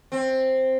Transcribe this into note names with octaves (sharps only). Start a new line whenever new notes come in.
C4